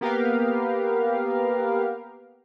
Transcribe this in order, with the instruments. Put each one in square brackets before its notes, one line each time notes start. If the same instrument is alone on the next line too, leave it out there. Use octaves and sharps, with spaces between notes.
[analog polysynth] A#3 B3 G4 A#4 B4 F5